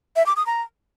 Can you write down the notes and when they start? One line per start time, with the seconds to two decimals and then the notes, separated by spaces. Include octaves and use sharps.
0.16 E5
0.26 D6
0.36 D#6
0.46 A#5